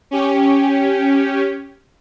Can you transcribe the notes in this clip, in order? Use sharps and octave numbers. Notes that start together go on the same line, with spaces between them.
C#4 G4